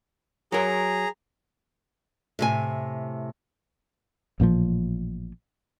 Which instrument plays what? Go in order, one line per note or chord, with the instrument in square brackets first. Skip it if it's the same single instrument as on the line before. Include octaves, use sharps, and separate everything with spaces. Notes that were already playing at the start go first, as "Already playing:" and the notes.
[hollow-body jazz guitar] F#3 A#4 [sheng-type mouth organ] G#4 A#5
[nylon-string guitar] A2 C3 G#5
[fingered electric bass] A1 A#2 D3 F3